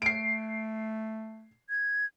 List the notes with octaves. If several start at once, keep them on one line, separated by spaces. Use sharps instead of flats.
A3 C7 D7
G#6